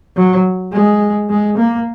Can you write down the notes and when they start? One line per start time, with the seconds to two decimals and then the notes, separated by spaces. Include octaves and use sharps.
0.16 F#3
0.73 G#3
1.30 G#3
1.58 A#3